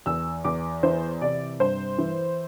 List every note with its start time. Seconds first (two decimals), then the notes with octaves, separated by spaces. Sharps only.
0.06 E2 E6
0.44 E2 D6
0.83 E3 C5
1.21 C3 D5
1.60 G2 C5
1.98 E3